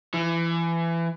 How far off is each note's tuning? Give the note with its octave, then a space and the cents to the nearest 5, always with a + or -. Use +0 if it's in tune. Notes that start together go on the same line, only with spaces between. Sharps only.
E3 +25